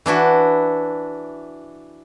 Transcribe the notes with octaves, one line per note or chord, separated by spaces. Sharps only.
E3 D4 E4 F#4